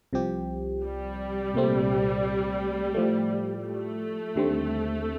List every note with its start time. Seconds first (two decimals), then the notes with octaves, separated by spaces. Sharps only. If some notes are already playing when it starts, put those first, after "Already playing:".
0.13 C2 C3 F3 C4 G4
0.83 G3
1.54 C2 A#2 A3 C4
2.94 A2 F3 A3
3.65 A3
4.36 D#2 D3 G3 C4